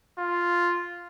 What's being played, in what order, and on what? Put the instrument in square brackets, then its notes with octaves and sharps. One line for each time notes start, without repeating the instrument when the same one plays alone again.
[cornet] F4